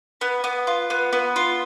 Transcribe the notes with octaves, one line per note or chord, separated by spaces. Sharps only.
B3
B3
F4
B3
B3
F4